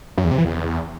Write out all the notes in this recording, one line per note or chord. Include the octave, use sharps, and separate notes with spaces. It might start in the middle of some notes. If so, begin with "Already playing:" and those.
F#2
E2
C3
E3
E2